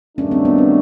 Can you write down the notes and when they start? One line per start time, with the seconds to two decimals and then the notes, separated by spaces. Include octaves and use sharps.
0.18 G2 D#3 F#3 A3 C#4 D4
0.31 C4
0.45 B3
0.58 C4